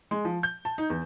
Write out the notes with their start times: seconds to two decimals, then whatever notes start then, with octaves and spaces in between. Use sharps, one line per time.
0.11 G#3
0.25 F3
0.43 G6
0.65 A5
0.78 D#4
0.90 E2